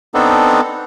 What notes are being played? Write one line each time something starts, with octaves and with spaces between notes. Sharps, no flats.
B3 C4 D4 D#4 A4